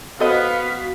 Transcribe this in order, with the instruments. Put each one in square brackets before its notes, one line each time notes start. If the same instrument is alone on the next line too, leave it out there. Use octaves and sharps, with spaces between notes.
[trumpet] B3 [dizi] F#4 [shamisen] A4 C5 D#5 [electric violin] F5 B6